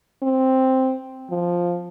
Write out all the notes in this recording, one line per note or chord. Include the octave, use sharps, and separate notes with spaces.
C4
F3